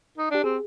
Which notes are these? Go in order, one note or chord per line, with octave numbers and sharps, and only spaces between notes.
D#4
D4 G4
C4 G#4